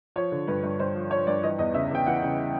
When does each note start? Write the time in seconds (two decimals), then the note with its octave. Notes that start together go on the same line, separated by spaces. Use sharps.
0.16 F3 C#5
0.32 D3
0.47 G2 B4
0.63 G2
0.79 G2 C5
0.95 F3
1.11 F3 C#5
1.27 G2 D5
1.43 E3 D#5
1.59 E2 D#5
1.74 C#3 E5
1.91 E2 G5
2.06 E3 F#5
2.22 C#3